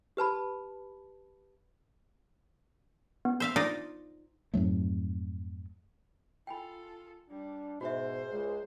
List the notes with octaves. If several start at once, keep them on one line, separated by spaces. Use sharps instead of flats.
G4 B4 A5 B5
B3
C5 E5 F5
D#4 F4 D5
F2 G#2 F#3 A3
F4 A4 G5 G#5 B5
G3 D4
G#2 B2 F#4 C5 E5
C#2 G#3